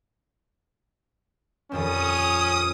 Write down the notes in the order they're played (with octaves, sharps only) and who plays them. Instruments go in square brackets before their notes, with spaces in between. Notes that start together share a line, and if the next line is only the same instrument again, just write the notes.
[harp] D#1 F2 C4 [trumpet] C#4 [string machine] D#6